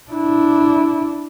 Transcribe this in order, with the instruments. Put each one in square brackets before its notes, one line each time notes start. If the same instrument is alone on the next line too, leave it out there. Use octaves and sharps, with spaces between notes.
[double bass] D4 E4